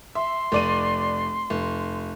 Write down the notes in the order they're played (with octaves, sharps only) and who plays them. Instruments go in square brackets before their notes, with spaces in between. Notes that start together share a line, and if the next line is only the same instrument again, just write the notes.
[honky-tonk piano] E5 [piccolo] C6
[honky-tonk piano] F1 D5 D#7
F1